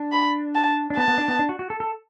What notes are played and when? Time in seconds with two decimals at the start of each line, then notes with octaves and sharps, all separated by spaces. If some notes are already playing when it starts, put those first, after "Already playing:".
Already playing: D4
0.12 B5
0.55 A5
0.90 D4
0.97 B3 A5
1.08 B3
1.18 D4
1.28 B3
1.39 D4
1.49 F#4
1.59 F#4
1.70 A4
1.80 A4